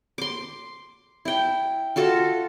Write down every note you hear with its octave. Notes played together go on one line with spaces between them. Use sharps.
C6 D6
E4 G5
F4 F#4 A4 A5